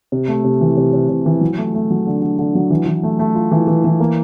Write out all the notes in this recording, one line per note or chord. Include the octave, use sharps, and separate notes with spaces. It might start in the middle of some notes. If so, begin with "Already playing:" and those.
C3
A3
C3
E3
C3
C3
C3
E3
F#3
A3
A3
F#3
D3
D3
D3
F#3
E3
E3
A3
A3
F4
E3
E3
E3
A#3